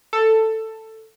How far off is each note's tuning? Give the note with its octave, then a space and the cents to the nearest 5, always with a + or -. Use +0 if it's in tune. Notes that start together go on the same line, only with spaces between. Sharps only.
A4 +10